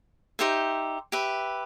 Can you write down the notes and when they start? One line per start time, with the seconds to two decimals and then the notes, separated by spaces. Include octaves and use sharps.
0.39 D#4 G4 C5 E5
1.12 G4 B4 E5